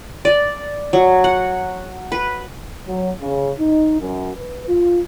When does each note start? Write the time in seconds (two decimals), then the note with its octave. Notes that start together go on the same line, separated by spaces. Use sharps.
0.25 D5
0.93 F#3
1.24 F#5
2.12 B4
2.88 F#3
3.21 C#3
3.59 D#4
4.00 F#2
4.35 B4
4.68 F4